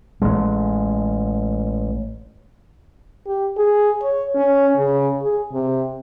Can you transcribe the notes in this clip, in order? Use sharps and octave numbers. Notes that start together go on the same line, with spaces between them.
A1 G#3
G4
G#4
C#5
C#4
C#3
G#4
C3